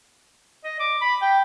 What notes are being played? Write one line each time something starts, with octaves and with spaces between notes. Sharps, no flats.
D#5
D6
B5
G5